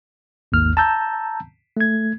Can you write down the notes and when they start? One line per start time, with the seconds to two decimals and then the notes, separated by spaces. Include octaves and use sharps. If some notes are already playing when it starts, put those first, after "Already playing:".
0.52 G#1 D#2 F6
0.77 A5 A#5 E6 G6
1.77 A3 G#6